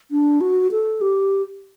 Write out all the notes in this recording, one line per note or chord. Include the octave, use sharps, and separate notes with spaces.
D4
F#4
A4
G4